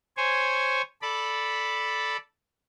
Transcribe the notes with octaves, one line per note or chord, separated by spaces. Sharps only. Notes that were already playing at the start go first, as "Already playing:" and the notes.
C5 C#5 G#5
A4 D5 B5